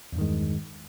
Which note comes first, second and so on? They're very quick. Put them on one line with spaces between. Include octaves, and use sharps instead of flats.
E2 G2 D#3 G#3